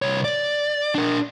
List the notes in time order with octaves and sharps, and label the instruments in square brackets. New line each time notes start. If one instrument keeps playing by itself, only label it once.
[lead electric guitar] C2 C#5
D5
D4 A#4